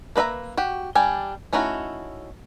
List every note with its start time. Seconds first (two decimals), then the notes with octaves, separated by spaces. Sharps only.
0.16 A#3 B4 D#5 E5 A#5
0.57 F#4 G4
0.95 G3 D4 G5 G#5
1.53 A3 C#4 D#4 E4 F#4